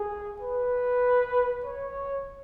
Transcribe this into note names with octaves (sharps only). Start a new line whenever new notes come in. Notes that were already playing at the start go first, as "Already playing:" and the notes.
Already playing: G#4
B4
C#5